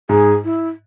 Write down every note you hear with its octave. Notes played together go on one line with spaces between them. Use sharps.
G#2 G#4
E4